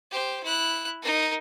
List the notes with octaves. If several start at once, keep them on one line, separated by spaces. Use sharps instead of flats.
G4 C5
E4 F#6
D#4 A#4